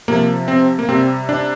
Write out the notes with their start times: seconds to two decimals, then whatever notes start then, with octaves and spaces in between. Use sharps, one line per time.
0.08 C3 F3 A#3
0.48 C4
0.79 A#3
0.89 C3 G3 C4
1.29 D4